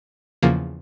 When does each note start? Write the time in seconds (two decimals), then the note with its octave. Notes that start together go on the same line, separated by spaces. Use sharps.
0.42 E2 C#3 F3 A#3